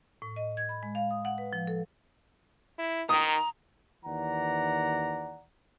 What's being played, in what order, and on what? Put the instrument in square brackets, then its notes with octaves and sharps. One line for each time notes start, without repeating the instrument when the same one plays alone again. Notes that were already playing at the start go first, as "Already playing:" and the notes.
[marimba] A2
D#5
G#6
B5
G#3
F5
D#6
F#5
B4
F3
A4
[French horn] E4
[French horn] D#3 [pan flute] A#5 [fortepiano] D#6
[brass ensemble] D#2 E3 D5 F#5 A#5